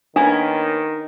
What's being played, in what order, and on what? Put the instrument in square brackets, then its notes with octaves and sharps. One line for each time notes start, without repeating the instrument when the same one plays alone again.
[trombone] D#3 [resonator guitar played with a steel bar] A#3 B3 C#4 [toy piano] D4